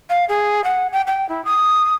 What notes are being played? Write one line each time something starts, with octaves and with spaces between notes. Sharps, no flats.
F5
G#4
F#5
G5
G5
E4
D#6